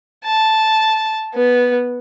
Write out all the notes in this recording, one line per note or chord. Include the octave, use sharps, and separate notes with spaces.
A5
B3